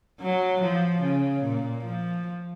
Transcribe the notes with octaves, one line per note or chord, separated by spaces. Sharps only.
F#3
F3
C#3
A#2
F3